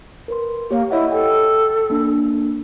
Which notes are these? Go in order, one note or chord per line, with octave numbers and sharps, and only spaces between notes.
A#4 B4 C6
A#3 G4 C#5
E4 C#5 D#5 F#5
A4 G5
A#3 D4